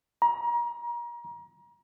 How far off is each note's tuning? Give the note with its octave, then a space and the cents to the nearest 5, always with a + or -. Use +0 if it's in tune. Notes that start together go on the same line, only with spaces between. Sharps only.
A#5 +30